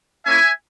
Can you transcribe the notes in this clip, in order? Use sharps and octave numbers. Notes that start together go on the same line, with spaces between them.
A#3 C#4 E4 E5 G#5